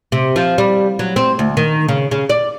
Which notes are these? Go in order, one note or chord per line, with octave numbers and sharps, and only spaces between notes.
C3
F3
G3
F#3
C4
D2
D#3
C#3
C#3
D5